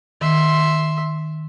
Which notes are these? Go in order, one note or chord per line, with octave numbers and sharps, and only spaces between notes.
D#3 E5 C6